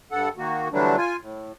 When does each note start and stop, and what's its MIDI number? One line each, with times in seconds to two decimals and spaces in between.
0.11 0.29 43
0.11 0.29 69
0.11 0.29 78
0.37 0.68 51
0.37 0.68 58
0.37 0.68 66
0.72 0.96 50
0.72 0.96 52
0.72 0.96 54
0.72 0.96 55
0.72 0.96 57
0.72 0.96 62
0.97 1.17 65
0.97 1.17 80
1.21 1.52 45